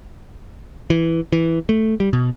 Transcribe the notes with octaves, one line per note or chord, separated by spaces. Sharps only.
E3
E3
A3
G3
B2